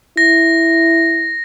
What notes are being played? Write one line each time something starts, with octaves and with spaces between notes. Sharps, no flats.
E4 A#6